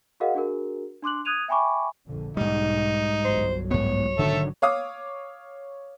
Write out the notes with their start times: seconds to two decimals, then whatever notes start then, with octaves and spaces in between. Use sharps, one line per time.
0.20 F#4 G#4 A#4 D#5 F5 F#5
0.35 D4 F#4 G#4 A#4
1.03 D4 C6 D6 F#6 F#7
1.25 D#6 F#6 G#6 D#7 F7
1.48 E5 G5 G#5 B5 C#6 D6
2.08 A#1 F2 D3
2.37 B1 G#2 G3 D#4
3.24 G1 C2 F#3 C5
3.71 G#2 B3 C#5
4.19 G#1 B2 D3 D#3 F#3 A4 E5
4.62 C#5 F5 D6 D#6